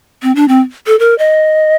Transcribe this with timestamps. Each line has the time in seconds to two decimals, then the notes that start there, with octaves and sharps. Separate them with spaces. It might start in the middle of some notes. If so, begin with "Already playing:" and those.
0.23 C4
0.36 D4
0.48 C4
0.87 A4
0.99 A#4
1.18 D#5